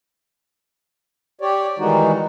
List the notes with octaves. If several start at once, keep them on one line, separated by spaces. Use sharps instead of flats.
G4 C#5 D5
D#3 E3 G3 G#3 D#4 F#4